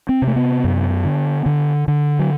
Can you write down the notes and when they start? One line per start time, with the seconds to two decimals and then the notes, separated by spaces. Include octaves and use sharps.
0.09 C4
0.22 C3
0.27 A3
0.36 B3
0.64 F#2
1.05 D3
1.46 D3
1.88 D3
2.19 F#3